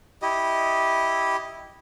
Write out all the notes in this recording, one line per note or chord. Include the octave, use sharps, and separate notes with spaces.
E4 G4 D#5